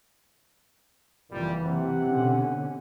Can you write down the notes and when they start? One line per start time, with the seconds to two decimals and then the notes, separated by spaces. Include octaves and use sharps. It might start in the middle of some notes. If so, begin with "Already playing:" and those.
1.32 F#1 F2 A#2 E3 G3
1.63 C3 F#5
2.09 B2 D3 C#4